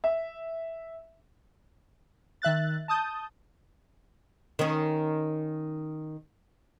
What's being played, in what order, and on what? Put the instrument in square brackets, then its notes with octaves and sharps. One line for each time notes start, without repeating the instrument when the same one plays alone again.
[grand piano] E5
[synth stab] D#3 E5 F#6 A6
A5 D#6 G6
[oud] D#3 C#4